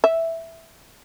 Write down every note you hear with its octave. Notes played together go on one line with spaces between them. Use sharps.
E5